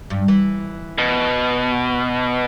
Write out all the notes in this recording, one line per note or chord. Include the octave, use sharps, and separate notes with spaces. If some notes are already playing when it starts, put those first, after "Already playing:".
G2
E3
B2